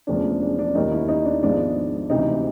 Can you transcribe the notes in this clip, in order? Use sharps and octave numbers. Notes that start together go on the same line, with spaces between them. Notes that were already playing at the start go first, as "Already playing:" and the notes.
E1 E2 C#3 F3 A3 D4
D4
D4
D#2 D#3 G3 A#3 D#4
E4
D#4
D4
G#1 G#2 F3 G#3 B3 D4
D2 C3 E3 D#4